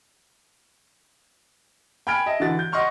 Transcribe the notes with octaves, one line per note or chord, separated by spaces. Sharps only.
G5 G#5 B5 F6 G#6 D7
D#5 E5 A5
D3 E3 F#4 A6
G6
D#5 F#5 C6 C#6 F6